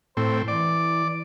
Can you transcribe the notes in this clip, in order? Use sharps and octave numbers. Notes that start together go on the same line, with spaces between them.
A2 C4 C5
E3 D5